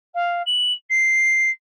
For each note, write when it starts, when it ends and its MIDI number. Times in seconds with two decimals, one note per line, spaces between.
0.14 0.42 77
0.46 0.72 102
0.90 1.50 96